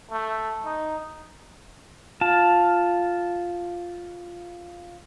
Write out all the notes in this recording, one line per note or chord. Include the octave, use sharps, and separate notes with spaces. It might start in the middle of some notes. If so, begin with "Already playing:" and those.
A3
D#4
F4 A5